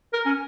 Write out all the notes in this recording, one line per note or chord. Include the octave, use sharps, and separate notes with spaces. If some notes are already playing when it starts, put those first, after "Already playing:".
A#4
C#4